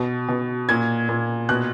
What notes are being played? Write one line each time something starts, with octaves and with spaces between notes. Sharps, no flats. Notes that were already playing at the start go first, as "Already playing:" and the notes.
Already playing: B2
B2
A#2 G#6
A#2
B2 F#6